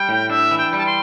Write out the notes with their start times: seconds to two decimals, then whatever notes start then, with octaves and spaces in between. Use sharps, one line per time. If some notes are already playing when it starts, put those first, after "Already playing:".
Already playing: G3 G5
0.09 A2
0.30 D4 E5
0.51 E3
0.58 G5
0.73 G3 A5
0.86 C6